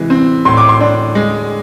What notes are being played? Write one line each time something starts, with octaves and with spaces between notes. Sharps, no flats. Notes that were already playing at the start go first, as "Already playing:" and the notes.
Already playing: C3 E3 G#3
C4
A2 C6
D6
C6
D4
G#3